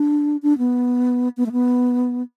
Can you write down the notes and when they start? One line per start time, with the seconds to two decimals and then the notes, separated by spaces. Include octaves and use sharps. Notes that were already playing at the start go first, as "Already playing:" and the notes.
Already playing: D4
0.43 D4
0.58 B3
1.37 B3
1.46 A3
1.52 B3